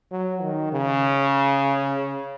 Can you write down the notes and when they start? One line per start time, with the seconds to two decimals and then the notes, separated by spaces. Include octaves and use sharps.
0.11 F#3
0.42 D#3
0.72 C#3